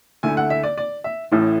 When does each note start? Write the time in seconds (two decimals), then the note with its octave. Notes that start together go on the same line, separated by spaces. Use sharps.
0.23 D2 D3 A3 E4 G#5
0.37 F#5
0.50 E5
0.63 D5
0.78 D5
1.04 E5
1.32 A1 A2 E3 A3 E4